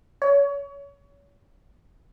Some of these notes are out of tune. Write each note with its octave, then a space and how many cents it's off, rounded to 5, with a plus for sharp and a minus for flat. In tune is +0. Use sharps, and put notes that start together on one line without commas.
C#5 +30